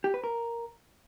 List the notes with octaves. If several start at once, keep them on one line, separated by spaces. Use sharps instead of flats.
G4
B4
A#4